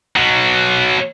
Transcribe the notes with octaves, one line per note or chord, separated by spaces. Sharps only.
B2 F#3